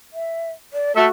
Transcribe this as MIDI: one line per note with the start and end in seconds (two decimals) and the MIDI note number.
0.13 0.51 76
0.73 0.92 74
0.96 1.06 57
0.96 1.11 66
0.96 1.06 69
0.96 1.06 76